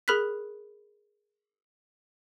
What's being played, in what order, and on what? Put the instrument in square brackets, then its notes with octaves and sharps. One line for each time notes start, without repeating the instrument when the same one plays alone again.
[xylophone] G#4 A#4 B5 F6 F#6 B6